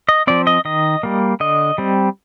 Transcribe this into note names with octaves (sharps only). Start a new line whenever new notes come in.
D#5
F3 C4 D5
D#5
D#3 D#5
G3 A#3
D3 D#5
G3 C4